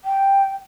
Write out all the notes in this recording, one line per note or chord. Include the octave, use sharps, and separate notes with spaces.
G5